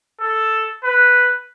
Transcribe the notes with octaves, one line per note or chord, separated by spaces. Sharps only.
A4
B4